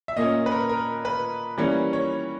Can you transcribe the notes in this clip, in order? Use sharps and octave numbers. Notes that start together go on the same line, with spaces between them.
E5
A#2 A#3 C#4 D#5
B4
A#4
A#4
B4
E3 G3 A#3 C#4
C#5